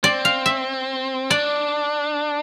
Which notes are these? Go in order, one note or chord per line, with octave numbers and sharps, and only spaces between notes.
C4 D5
F5
E5
D4 D5